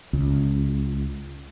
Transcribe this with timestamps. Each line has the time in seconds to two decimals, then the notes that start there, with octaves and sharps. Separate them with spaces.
0.13 C#2